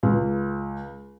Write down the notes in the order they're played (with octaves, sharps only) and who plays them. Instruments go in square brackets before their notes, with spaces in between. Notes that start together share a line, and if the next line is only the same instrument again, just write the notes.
[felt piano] C#2